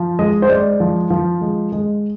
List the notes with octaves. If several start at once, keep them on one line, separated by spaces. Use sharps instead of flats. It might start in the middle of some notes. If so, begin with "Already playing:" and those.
Already playing: F3
G#3 D#5
C5
G#3 D5
F3
F3
G#3
G#3